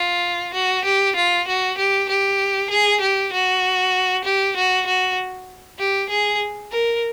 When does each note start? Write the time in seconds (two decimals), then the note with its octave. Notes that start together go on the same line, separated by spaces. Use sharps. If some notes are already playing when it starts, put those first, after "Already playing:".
Already playing: F4
0.54 F#4
0.85 G4
1.16 F4
1.47 F#4
1.78 G4
2.09 G4
2.70 G#4
3.01 G4
3.33 F#4
4.25 G4
4.56 F#4
4.86 F#4
5.79 G4
6.10 G#4
6.72 A#4